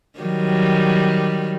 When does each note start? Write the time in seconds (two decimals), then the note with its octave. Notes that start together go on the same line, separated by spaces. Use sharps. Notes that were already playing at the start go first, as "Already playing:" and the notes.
0.19 D#3 F#3 G3